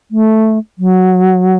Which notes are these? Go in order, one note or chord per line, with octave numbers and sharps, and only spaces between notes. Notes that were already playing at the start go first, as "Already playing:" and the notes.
A3
F#3